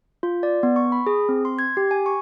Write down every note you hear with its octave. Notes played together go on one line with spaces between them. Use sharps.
F4
D5
B3
C#6
B5
G#4
C4
C6
G#6
G4
G#5
C#6